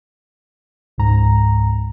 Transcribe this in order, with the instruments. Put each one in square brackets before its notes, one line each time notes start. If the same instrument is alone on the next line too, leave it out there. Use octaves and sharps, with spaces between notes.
[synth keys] C#2 G#2 A#5